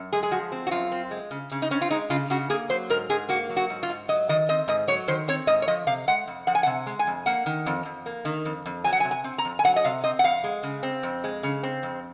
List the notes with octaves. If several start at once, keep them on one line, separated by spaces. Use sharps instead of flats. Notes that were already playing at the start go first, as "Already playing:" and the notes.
Already playing: F#2
G#3 G#4
G#4
F3 F#4
C4
F#4
F#2 F4
C4
G#3
C#3
C#3
D#4
C4 C#4
F4
G#3 D#4
C#3 F4
C#3 F#4
A#3 G#4
F#3 C5
G#2 A#4
G#2 G#4
A#3 F#4
F#3
F#4
G#2
F4
G#2
F#3 D#5
D#3 D#5
C4 D#5
G#2 D#5
F#3 C#5
D#3 C5
C4 C#5
G#2 D#5
C#5
F3 D#5
C3 F5
G#3 F#5
F2
F3 F#5
G#5
F#5
C3
G#3
G#5
F2
A#3 F#5
D#3
F2
F2
A#3
D#3
F2
F2
F#3 G#5
F#5
G#5
C3
G#5
C4
A#5
F2
G#5
F#3 F#5
D#5
C3 F5
C4 D#5
F#5
F2 F5
G#3
C#3
C4
F2
G#3
C#3
C4
F2